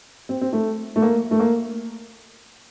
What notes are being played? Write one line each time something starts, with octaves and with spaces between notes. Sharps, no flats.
C4
C4
A3
A3
A#3
A3
A#3